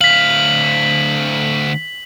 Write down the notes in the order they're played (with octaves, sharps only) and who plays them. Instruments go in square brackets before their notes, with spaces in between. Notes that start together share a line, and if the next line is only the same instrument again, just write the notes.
[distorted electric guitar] D2 F5 [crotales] B6 F#7